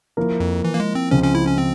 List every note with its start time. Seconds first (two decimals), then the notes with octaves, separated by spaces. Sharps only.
0.17 F3 A#3 E4 A#4
0.40 F2
0.64 E3
0.74 A#3
0.80 G#3
0.95 C4
1.11 C#2 C#3 F3 C4 C#4
1.23 C#4
1.35 E4
1.47 C#4
1.58 C4